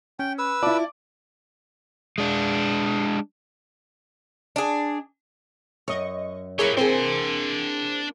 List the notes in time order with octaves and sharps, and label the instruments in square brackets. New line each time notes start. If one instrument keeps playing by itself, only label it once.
[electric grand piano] C#4 [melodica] G5
[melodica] B4 E6
[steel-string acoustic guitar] E4 F4 [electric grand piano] D5 A5 D6
[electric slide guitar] G#3 D4
[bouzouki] D4 G#4
[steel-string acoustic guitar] F#2 [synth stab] D#5 C#6
[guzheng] A#3 E4 G5 [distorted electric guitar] G4 B4 [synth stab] G#4 C#5 C#6
[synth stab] C4 [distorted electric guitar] D4 C6 [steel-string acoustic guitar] G#4 C5